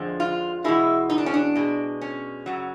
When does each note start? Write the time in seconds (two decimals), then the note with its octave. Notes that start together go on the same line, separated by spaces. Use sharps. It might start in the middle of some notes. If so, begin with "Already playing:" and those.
Already playing: F2 D3 F3 G#3
0.20 F4
0.64 E2 B2 G#3 E4
1.10 D#4
1.18 D4
1.26 C#4
1.34 D4
1.55 B2 G#3
2.01 C#4
2.46 F#2 C#3 F#3